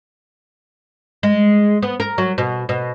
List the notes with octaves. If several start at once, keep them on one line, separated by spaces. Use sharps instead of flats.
G#3
B3
A#4
F#3
B2
B2